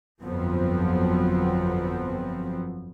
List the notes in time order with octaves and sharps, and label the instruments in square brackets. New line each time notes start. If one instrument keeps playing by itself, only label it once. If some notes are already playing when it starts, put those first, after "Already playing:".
[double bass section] G1 F2 F3 F#3 B3 C4